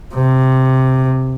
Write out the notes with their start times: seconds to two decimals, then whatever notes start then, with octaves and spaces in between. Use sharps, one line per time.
0.15 C3